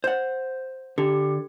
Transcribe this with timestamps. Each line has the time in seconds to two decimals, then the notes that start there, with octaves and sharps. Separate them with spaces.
0.04 C5 F#5
0.98 D3 G4